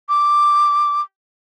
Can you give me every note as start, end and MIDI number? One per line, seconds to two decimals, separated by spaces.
0.09 1.01 86